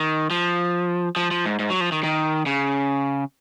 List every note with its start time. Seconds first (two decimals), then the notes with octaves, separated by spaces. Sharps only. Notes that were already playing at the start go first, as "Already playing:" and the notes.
Already playing: D#3
0.30 F3
1.16 F3
1.31 F3
1.46 G#2
1.59 G#2
1.70 F#3
1.81 F3
1.92 D#3
2.03 D#3
2.46 C#3